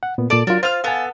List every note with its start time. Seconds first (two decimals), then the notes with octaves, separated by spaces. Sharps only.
0.03 F#5
0.18 A#2 B3
0.30 A#2 A4 D5 A5
0.47 F#3 D4 F4 A#4
0.63 F4 C5 F5 F6
0.84 B3 A4 F5 G#5